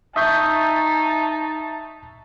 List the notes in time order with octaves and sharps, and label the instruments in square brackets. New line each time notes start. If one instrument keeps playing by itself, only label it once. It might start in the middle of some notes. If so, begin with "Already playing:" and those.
[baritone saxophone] D#4 [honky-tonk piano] E5 C#6 G6 [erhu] A5 [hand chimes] D#6